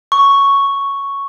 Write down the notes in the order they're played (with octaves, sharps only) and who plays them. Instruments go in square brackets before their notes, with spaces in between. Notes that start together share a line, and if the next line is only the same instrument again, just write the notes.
[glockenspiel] C#6